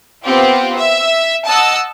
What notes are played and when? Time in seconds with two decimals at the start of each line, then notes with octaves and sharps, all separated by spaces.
0.24 B3 C4 F4 G4
0.78 E5
1.47 D#5 F#5 A5 E6